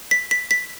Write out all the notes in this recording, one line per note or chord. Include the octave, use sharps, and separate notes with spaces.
B6
B6
B6